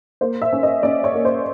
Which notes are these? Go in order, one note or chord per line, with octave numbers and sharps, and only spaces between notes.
A#3 C5
E5
C#4
D#5
C#4 D5
C#5
A#3
C5